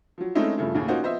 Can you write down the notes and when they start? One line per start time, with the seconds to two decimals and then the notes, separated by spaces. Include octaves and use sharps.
0.18 F3 F#3
0.35 G#3 A3 C4 C#4 D#4 E4
0.57 G2 C#3 F3 A3 E4
0.74 D#2 A2 C#3
0.88 A#3 C#4 D#4 F4 F#4 C5
1.02 F3 B3 C5 D#5 E5